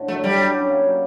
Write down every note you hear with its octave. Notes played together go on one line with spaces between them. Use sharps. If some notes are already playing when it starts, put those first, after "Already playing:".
Already playing: A2 D3
F#3 A3
G3 D4
F#3
C#4
A#3
F#3